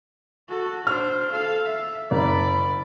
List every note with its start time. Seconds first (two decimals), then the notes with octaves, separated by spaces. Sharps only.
0.49 F#4 A4
0.87 D4 C5 F6
1.31 A4 F5
1.66 E5
2.11 F#1 D5 B5